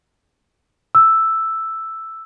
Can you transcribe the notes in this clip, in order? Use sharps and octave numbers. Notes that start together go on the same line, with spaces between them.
E6